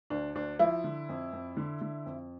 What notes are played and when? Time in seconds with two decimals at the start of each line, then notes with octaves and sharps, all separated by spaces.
0.10 D2 D4
0.35 D2 D4
0.59 F3 E4
0.84 D3
1.09 F2
1.33 F2
1.57 D3
1.81 D3
2.06 F2